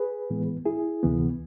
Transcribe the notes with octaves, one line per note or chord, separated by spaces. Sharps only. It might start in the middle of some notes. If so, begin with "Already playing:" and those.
Already playing: G#4 B4
A2 E3 G#3 B3
E4 G#4
D2 C3 E3 B3